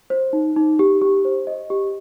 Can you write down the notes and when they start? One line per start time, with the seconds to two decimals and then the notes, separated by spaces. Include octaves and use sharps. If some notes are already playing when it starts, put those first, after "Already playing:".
0.10 C5
0.33 D#4
0.56 D#4
0.79 G4
1.02 G4
1.25 C5
1.47 D#5
1.70 G4